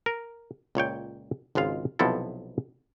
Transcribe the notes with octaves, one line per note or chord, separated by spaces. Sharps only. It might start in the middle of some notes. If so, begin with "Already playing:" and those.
A#4
C#2 A#2 C#5 G5
G#1 C#2 G#3 F4 F5
B1 C3 F3 B3 E4 A4